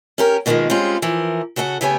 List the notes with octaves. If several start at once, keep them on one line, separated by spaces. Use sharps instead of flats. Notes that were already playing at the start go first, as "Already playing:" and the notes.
C#4 G4 A#4
B2 D3 D#3 F3 G#3 A#3
G3 G#3 C4 C#4 F4
E3 F3 A#4
C#3 F#4 A4 D#5 F#5
C#3 A3 B3 G4 C#5 G#5